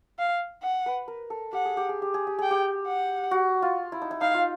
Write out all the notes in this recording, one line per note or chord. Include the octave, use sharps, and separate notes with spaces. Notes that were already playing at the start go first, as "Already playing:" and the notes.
F5
F#5
B4
A#4
A4
G4 F#5
G#4
G4
G#4
G4
G#4
G4
G#4 G5
G4
F#5
F#4
F4
E4
D#4
E4
D#4 F5
F4